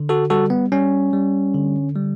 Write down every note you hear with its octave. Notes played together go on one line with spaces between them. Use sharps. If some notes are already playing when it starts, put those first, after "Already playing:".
Already playing: D3
F#4 A4
G3 F#4 A4
B3
G3 C#4
G3
D3
G3